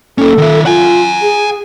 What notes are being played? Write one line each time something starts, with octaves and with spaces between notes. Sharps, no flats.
A#3 C#4 A4
D#3 E5
F4 F#5 G#5
G#4